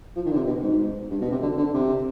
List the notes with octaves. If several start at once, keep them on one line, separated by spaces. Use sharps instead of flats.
F3
D#3
D3
C3
B2
G#2
G2
B2
C3
D3
D3
C3